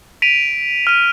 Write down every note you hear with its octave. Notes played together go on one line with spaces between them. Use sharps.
B6 D7 D#7 F7
F6 D#7